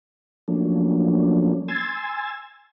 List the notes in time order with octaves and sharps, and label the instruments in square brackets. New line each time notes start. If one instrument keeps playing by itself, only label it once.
[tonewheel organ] F3 F#3 A3 A#3 C#4 D4
G#5 C6 E6 G#6 A6